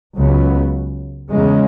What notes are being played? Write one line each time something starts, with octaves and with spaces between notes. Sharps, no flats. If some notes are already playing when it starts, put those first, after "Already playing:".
C#2 C#3 F#3 B3
E2 C#3 G#3